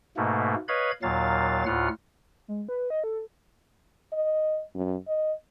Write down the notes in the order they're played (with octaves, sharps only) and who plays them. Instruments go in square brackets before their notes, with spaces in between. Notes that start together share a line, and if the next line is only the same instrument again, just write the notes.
[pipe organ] G#2 B2 A3 A#3
B4 C#5 D#5 F5 B5 G#6
D#2 A#2 F#3 F5 A6
D2 A2 F4 F#5 F6
[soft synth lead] G#3
B4
D#5
A4
[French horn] D#5
F#2
D#5